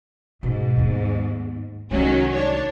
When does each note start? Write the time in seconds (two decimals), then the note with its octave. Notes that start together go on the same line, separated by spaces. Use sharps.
0.43 G#2 B2 C#4
0.77 D#2 B3
1.91 C2 D#3 F#3 G#3 C#4
2.34 D4 C#5